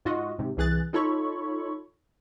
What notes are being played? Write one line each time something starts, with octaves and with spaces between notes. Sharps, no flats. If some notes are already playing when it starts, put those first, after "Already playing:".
G#2 F4 F#4 D#5
G#2 C3
C2 E3 G#4 F#6 A6
D#4 F4 A4 C#5 B5 C#6